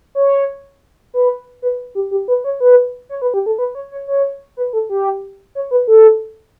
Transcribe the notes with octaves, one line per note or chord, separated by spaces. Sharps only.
C#5
B4
B4
G4
G4
B4
C#5
B4
C#5
B4
G4
A4
B4
C#5
C#5
C#5
B4
A4
G4
C#5
B4
A4